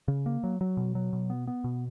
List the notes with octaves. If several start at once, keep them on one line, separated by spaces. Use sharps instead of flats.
C#3
A#3
F#3
F#3
B2
F#3
B2
B3
B3
B2